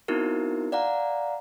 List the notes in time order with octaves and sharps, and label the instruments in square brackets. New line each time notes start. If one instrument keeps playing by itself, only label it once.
[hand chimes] B3 C4 D#4 E4 F#4 A#4
D5 F5 F#5 A#5